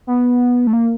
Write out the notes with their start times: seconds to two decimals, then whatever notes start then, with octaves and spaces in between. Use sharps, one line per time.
0.07 B3
0.67 A3
0.73 A#3